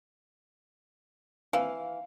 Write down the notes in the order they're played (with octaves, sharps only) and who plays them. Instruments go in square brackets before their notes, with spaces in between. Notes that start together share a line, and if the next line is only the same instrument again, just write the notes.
[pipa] E3 [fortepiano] F5